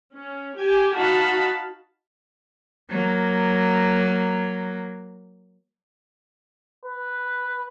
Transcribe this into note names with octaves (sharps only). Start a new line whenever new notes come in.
C#4
G4 G#5
D#4 F#4 F5 A5 B5
F#3 A#3
B4